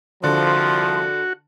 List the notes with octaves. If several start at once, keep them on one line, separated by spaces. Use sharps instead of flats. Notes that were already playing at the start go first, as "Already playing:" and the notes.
C2 D3 F3 F#4 C6